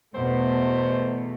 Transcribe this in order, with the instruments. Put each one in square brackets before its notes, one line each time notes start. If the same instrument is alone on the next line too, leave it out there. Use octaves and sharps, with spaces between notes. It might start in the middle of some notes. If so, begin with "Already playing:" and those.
[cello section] E2 B2 A3 [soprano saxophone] C5